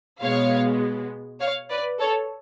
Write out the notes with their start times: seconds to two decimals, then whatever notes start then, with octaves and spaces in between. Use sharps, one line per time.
0.21 B2 G#3 B3 C#5 F5
1.40 C#5 F5
1.70 B4 D5
1.99 A4 C#5